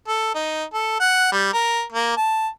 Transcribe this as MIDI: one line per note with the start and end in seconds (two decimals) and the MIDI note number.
0.08 0.31 69
0.35 0.64 63
0.74 0.98 69
1.00 1.31 78
1.32 1.49 55
1.53 1.82 70
1.92 2.15 58
2.17 2.48 81